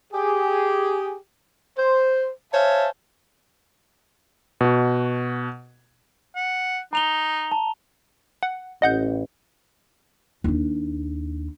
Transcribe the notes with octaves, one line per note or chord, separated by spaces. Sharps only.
G4 G#4
C5
C5 C#5 E5 F5 G#5 A5
B2 F#4
F#5
D#4 A#5 F7 G7
A5
F#5
A1 D#5 F#5 G6
D#2 D4